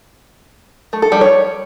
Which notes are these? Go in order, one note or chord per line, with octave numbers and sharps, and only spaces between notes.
A3
A4
G3
C#5